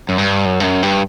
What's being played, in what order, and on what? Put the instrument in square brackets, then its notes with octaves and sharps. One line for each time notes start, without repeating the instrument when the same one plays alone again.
[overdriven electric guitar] F#2
G2
F#2
G2
F#2
G2